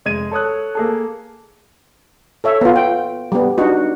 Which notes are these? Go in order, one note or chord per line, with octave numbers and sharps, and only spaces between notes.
F1 G#3 G#6 D#7
A4 C#5 D#6 F#6
A#3 G#4 A4
A4 C#5 E5
B3 F4
G5
G3 B3
D4 D#4 F#4